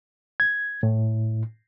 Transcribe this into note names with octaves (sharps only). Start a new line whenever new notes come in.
G#6
A2